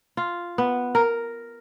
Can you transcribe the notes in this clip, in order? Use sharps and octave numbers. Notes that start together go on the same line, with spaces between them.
F4
B3
A#4